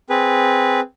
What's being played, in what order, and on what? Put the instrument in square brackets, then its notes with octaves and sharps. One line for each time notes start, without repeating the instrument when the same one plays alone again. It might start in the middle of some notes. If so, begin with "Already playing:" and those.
[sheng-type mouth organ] C4 G#4 B4